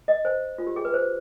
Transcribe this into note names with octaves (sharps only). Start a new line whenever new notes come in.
D#5
C5
F4
G4
G#4
B4
C5